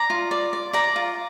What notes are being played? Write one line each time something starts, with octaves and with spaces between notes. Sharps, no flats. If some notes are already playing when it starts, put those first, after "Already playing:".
Already playing: D5 A#5
F4
D5
D5
D5 A#5
F4